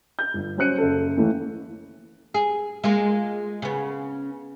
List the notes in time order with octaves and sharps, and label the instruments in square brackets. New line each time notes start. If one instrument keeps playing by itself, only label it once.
[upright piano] G6
G1
F#3 C#4 C5 F#6 C#7 D#7
F#1 A4
D#2 E3 A3
[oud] G#4
G#3 A#3 F4
C#3 B3